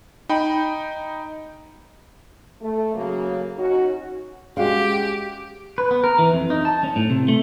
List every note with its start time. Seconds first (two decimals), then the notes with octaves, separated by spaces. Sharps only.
0.29 D#4 G5 B5
2.61 A3
2.95 C#3 F#3 A#3
3.58 C#4 D#4 F#4
4.57 G#3 C#4 F#4 G4 F5
5.78 B4
5.91 B3
6.04 A#4
6.19 E3
6.33 F2
6.50 D#4
6.65 A5
6.84 C#4
6.96 A2
7.10 C3
7.28 A3